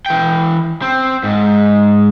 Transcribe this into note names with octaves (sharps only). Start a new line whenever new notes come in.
E3 G5
C4
G#2